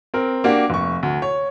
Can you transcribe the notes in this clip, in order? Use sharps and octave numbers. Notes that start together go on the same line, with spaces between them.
C4 A#4
A#3 D4 F#4 G4
F1 C#6
D2
C#5